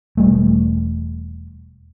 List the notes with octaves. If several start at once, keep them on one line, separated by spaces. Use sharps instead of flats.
E1 G3 A3